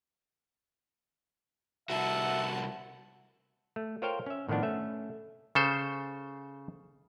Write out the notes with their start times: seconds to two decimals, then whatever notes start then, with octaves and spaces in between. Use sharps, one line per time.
1.89 C2 F#4 E5 F#5 A5
3.76 A3
4.02 F4 A#4 C5 C#5 F5 G5
4.26 C#4 E5
4.49 A2 D#3 F3 B3 D4
4.63 A3 C#4 E5
5.55 C#3 A4 C5